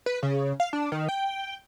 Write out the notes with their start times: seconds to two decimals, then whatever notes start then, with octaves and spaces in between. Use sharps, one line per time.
0.06 B4
0.23 C#3
0.60 F5
0.73 D4
0.92 D#3
1.09 G5